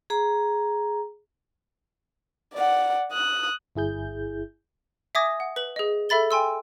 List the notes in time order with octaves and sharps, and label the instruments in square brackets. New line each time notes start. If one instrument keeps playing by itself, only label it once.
[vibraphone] G#4 A#5
[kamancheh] D5 F#5
D#6 F#6
[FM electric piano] G1 E4 G#4 G6
[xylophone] E5 G#5 D6 D#6 G#6 A#6
F#5
B4 F#7
G#4 D#5
A4 E5 B5 A6 G7
G5 G#5 C6 E6